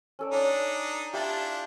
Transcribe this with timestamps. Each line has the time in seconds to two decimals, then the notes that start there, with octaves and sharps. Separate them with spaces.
0.19 C#4 A4 D5
0.32 D4 D#4 D5 G#5
1.13 D4 E4 F4 G4 A5